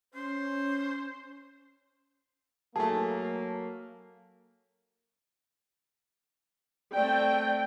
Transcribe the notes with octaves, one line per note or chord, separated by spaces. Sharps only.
C#4 C5
F#3 A3 A#3 G#4 A5
A3 C4 D5 G5